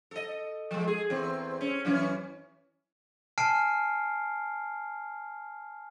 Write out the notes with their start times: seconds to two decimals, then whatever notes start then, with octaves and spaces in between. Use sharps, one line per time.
0.11 A4 D#5
0.71 F3 G#3
0.87 G#4
1.10 E2 C4
1.61 C#4
1.85 F#2 E3 C#4
3.38 G#5 A5 F6 C7 D7